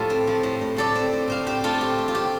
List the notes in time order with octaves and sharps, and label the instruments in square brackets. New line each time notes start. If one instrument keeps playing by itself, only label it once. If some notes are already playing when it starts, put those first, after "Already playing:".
Already playing: [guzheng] A2 F3 F4 G4 A4
C4
F3
A2
A2
A2 A4 D5
C4
A2
A2 C5 F5
C4 G4 C5
A2 F4 A4
C4 G4
A3
F4
C4 G4